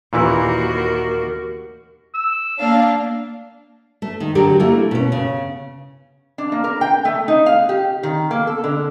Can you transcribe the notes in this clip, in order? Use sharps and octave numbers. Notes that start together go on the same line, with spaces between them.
D#2 A#2 E3 E4 F#4 A#4
E6
A#3 D4 F5
A3
D#3
D3 F#3 G4 A#4
A3 A#3 E4
B2 C#4
C#3
D4
A#3
A#4
G5
A3
D#4
F5
G4
D#3
A#3
A4
D3